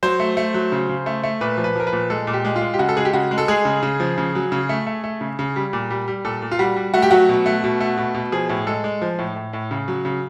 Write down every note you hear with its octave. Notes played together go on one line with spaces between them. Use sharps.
F#3 C5
A3
A3
F#3
C#3
C#3
A3
A3
A#2 B4
F3
B4
F3 A#4
B4
A#2
G#3 A4
A#2
G4
G#3
F4
G#3
G4
C#3 F#4
A4
G#3 G#4
G4
C#3 F#4
G#3
A4
G#3 G#4
C#3
C#3
F3
C#3
F#3
C#3
A3
A3
A3
C#3
C#3
G3
A#2
G3
G3
A#2 A4
A#2
F4
G3 F#4
G3
A3 F#4
G4
F#3 F#4
B2
A3
B2
A3
B2
B2
F3 G#4
A2
G#3 A4
G#3
F3
A2
A2
A2
C#3
F#3
C#3